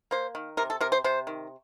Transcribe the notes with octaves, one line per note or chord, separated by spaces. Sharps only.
A#3 C5
D#3
C3 A#4
A4
C3 A#4
C5
C3 C5
D#3